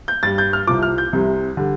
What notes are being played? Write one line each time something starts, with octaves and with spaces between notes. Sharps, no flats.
G6
G2 G3 A6
G6
F6
C2 C3 F3 D6
F6
G6
C2 C3 G3
D3 G3